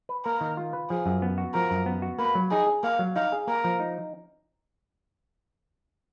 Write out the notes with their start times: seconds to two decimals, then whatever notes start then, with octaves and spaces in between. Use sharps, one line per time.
0.09 B4
0.25 A#3 A#4
0.41 D#3
0.57 F4
0.73 B4
0.90 F3 G#4
1.06 F#2
1.22 B3
1.38 F#4
1.54 F3 A#4
1.71 F#2
1.86 B3
2.02 F#4
2.19 A#3 B4
2.35 F#3
2.51 D#4 G#4
2.67 G#4
2.83 A#3 F5
2.99 F#3
3.16 D#4 F5
3.32 G#4
3.47 A#3 A#4
3.64 F3
3.80 D#4